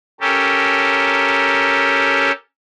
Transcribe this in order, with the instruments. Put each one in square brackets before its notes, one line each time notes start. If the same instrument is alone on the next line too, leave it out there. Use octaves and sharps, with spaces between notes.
[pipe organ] C#4 G4 A4 A#4